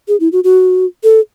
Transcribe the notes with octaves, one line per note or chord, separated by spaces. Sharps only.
G#4
E4
F#4
F#4
A4